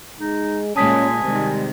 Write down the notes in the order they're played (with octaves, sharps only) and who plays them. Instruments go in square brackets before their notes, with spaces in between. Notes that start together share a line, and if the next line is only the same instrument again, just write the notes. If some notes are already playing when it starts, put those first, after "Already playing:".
[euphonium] G#3 [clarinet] D#4
[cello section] A#2 G3 G#3 [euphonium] C#4 [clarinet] G#5 [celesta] A5 D#6 B6
[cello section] C3 D#3 G#3 [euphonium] G3